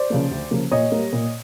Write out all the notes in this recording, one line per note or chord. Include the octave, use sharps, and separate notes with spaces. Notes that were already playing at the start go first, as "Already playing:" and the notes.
Already playing: C5 D5
C#3 F3 A#3
D2
C#3 F3 A#3
A#2 C#5 D#5
G3 A#3
A#2